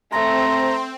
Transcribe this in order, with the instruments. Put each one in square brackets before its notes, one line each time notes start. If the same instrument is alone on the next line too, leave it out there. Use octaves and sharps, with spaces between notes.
[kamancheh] A3 [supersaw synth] C4 [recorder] A#5 [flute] C6